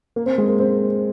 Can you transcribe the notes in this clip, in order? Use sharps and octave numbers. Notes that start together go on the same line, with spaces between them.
A#3
C4
G#3
A#3
C4